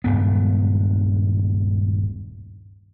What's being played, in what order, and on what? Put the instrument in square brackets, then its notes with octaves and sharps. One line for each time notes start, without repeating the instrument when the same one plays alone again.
[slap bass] D#1 C#2 G2 B3